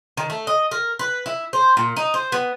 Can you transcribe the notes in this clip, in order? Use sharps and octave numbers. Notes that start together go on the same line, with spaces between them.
D#3
A3
D#5
A#4
B4
E4
C5
A#2
D#4
C5
B3